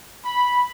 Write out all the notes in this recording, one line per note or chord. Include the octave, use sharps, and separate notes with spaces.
B5